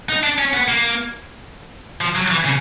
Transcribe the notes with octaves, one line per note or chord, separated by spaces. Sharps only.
D#4
D4
C#4
B3
A#3
F3
F#3
E3
C#3